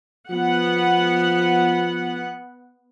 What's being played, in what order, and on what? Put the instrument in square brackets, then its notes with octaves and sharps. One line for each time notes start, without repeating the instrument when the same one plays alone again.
[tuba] F3 [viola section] B3 F#5